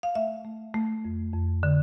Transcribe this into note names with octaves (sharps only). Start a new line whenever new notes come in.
F5
A3 E5
A3
A3
F2
F2
D3